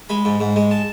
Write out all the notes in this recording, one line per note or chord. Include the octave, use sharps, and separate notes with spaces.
G#3 B5
G#2
G#2
G#3
A5